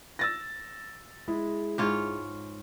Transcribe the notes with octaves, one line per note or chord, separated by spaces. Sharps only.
E6 A6 A#6
G#3 E4 G#4
G#2 F4 C#5